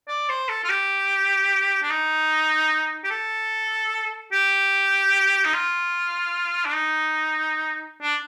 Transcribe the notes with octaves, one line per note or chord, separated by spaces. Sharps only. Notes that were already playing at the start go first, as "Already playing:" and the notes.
D5
C5
A4
F4
G4
D4
D#4
G4
A4
G4
D#4
F4
D4
D#4
D4